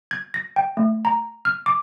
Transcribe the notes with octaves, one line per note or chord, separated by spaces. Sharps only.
G#6
A#6
G5
A3
A#5
F6
D6